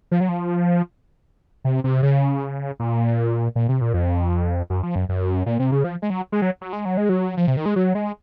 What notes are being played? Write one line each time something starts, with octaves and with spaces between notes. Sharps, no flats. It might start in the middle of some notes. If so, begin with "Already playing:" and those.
F3
F#3
F3
C3
C3
C#3
A#2
A#2
C3
A#2
F2
F#2
F3
F#2
F#2
A#2
C3
C#3
F3
G#3
F#3
G#3
F#3
F#3
G#3
F#3
G#3
F#3
F3
C3
D#3
G#3
F#3
G#3